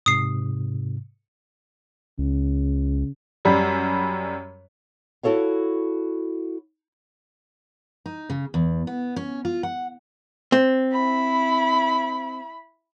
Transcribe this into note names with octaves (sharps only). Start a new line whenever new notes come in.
G#2 C3 D#6 C7
C#2 C#3
F#2 G3
E4 F#4 A4 C#5 F5
D#4
C#3
E2
B3
C#4
F4
F#5
C4
E4 B5